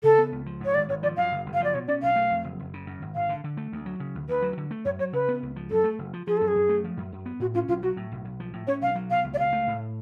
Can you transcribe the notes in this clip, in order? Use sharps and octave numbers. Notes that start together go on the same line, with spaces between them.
C#3 A4
B3
C#2
F3
G#2 C#5
G#1 D5
G#1 C#5
F3 D5
F#2 F5
F#1
F#1
F5
F3 D5
B2 C#5
C#4 D5
B1 F5
A3
F2
F#1
F#1
C#3
F#2
G#1
G#1 F5
D3
D3
A3
D2
F#3
C#3
D2
D2 B4
F#3
D3
A3
F#2 C#5
F#3 C#5
C#3 B4
B3
C#2
F3
F#2 A4
A3
F#1
F3
F3 G#4
F#2 A4
G#4
F#2
A3
F3
F#2
F#2
B3
A2 F#4
C#4 F4
B1 F4
F#3 F#4
A2
B1
B1
F3
A2
C#4 C#5
B1 F5
F#3
B2 F5
C#2
D5
C#2 F5
A3
A2